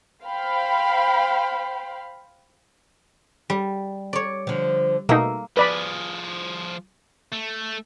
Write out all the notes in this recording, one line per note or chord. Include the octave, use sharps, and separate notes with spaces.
C5 F5 G5 B5
G3
C#5 D5
D3 F3
B2 A3 A#3 D#4 E5
F3 G#4 B4 D5 B5
A3